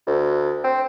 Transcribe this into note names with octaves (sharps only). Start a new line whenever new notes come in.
D2
C4